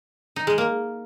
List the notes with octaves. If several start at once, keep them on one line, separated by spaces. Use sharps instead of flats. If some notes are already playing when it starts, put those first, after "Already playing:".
D#4
G#3
A#3